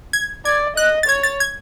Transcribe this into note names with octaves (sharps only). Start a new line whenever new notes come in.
G#6
D5 G#6
D#5 F#6
A6
C#5 G#6
A6
G#6